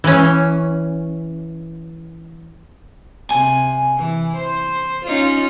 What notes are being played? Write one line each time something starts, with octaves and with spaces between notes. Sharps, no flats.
E3 C#4
C3 G#5
E3
C5
C#4 D#4 F4